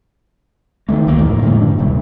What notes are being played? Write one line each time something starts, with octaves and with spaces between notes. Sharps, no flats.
D#3 E3 A3 A#3
E1 C#2 D#3 A#3
E2 A2 F3 A#3
A2 D3 G#3 A#3
G2 D4
D#1 D2 C3 G3